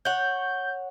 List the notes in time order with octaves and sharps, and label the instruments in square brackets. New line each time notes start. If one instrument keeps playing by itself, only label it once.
[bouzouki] C#5 F#5 [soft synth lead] G6